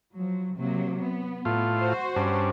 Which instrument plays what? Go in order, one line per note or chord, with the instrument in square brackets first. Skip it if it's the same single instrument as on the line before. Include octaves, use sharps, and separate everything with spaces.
[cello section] F3 F#3
C3 F#3 A#3
B3
[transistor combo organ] A2 F4
[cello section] F#4 C5
[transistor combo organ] G2 C#4 D4